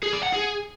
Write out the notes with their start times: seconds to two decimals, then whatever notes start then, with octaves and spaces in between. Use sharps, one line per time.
0.03 G#4
0.13 D5
0.23 F#5
0.33 G#4